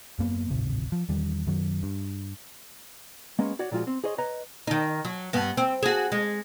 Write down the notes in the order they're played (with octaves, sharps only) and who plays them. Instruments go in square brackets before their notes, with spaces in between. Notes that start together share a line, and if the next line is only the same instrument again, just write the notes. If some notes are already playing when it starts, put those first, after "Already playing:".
[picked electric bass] F#2 A#3 B3
D1 G#1 C3
F3
E2 D#3 G3
F#2 D#3 F#3
G2
[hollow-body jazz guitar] G#3 A#3 B3 C#4
F#4 C#5 D5
A#2 F3 G#3 F4 F#4
C4
G#4 C5 C#5 D#5
B4 C#5 D#5 A#5
[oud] D#3 D#4
F#3
G2 B3
C4
F#4 G#4
G#3